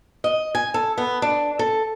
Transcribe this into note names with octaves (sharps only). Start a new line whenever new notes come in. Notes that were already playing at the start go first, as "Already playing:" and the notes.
D#5
G#5
A4
B3
D4
A4